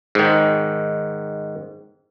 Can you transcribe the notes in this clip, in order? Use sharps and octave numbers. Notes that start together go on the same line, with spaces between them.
G#2 D#3